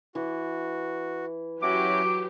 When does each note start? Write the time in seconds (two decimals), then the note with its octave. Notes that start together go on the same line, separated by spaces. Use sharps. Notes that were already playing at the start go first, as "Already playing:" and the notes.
0.15 E3 F#4
1.62 F#3 C#4 E4 F#4 G4 D6